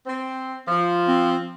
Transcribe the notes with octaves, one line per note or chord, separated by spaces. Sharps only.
C4
F3
C4